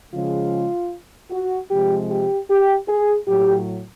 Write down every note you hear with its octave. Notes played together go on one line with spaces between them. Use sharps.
C#3 F3 G#3 F4
F#4
C3 F3 G#3 G4
G4
G4
G#4
A2 F#3 G4